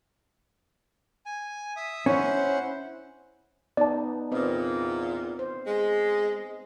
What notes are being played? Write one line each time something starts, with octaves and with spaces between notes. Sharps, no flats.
G#5
E5 D#6
C#4 E4 C5 F#5
B3 D#4 D5 A5
E2 A#2 C4 B4 D#5
C5
G#3